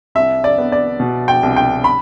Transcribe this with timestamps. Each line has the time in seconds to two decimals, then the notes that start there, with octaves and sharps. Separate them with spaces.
0.15 C2 E5
0.44 D5
0.58 B3
0.72 D5
1.00 B2
1.28 G5
1.43 C2
1.56 G5
1.84 B5